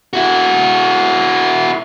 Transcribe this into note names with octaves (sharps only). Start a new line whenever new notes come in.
E4 F#4